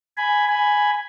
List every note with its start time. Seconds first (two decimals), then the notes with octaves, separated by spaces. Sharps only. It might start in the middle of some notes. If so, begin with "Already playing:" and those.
0.17 G#5 B5
0.48 G#5 B5